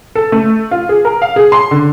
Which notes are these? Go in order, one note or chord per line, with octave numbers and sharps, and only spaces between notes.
A4
A3
F4
G#4
A#4
F5
G#4
C6
D3